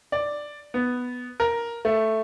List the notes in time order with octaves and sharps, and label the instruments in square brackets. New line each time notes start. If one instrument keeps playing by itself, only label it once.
[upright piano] D5
B3
A#4
A3